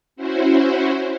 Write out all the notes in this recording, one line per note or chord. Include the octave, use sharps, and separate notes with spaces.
C#4 E4 F#4 C5